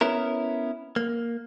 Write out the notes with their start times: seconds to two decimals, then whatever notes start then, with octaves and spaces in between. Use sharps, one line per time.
0.01 B3 C#4 E4 A#4
0.96 A#3